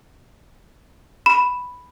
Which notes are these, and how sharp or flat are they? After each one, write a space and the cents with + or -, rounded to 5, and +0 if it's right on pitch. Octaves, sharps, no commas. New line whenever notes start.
B5 +0